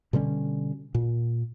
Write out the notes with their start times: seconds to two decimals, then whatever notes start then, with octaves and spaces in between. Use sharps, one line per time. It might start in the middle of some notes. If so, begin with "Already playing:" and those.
0.13 B2 D3 G3 C#4
0.95 A#2